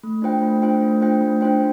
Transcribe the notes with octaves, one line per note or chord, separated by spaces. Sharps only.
A3
D4 F4 C5 G5
A3
D4 F4 C5 G5
A3
D4 F4 C5 G5
A3
D4 F4 C5 G5